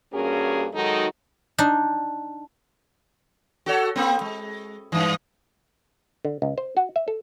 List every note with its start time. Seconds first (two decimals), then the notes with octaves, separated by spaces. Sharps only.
0.13 G2 A#3 C#4 F#4 G#4 A#4
0.74 D#3 F#3 G#3 D#4 F#4 A4
1.58 D4 D#4
3.66 F#4 A4 C#5
3.96 A#3 C4
4.21 G#3
4.92 G2 E3
6.25 D3
6.42 C#2
6.58 C5
6.77 F#4
6.96 E5
7.08 A4